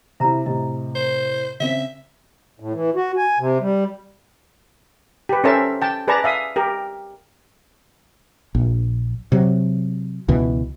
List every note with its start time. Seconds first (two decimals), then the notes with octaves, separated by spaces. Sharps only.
0.20 C3 E4 E5 A#5
0.46 A2 C3 D#5
0.95 C5
1.60 C#3 C4 E5
2.60 A2
2.73 E3
2.95 F#4
3.17 G#5
3.39 C3
3.61 G3
5.29 G4 B4
5.44 C#4 A4 A#4 C5 E5 A5
5.82 G5 A5
6.08 G#4 B4 D5 A5 A#5
6.24 E5 F5 D#6
6.56 G4 A#4
8.55 A#1
9.32 C3 F#3
10.29 C#2 B2 E3